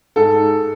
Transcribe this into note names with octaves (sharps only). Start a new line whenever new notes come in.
G#2 A4